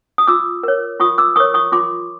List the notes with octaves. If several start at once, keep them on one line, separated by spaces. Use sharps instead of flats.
D#6
F4 D6 E6
A#4 C#5
F4 C#6 D#6
D6 E6
A#4 C#5 C#6 D#6
C#6 D#6
F4 C6 D6